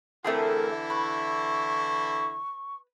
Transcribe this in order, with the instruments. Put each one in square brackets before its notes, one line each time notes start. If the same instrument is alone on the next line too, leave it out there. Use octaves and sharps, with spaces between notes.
[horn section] D3 E3 E4 [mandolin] A3 C4 G#4 [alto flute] A#4
[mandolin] B4 [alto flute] C#6